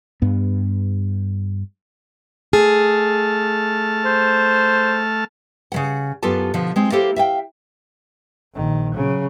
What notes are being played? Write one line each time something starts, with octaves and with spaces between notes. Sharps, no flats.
G2 B3
A3 G#4 A5 F6
C5
C#3 E3 F#5
F#2 B3 F4 G4 A4 A5
B2 D3 F3
G#3 C4
A#3 E4 G4 A4 C5
E5 F5 G5
A#1 D#3
C#3 F#3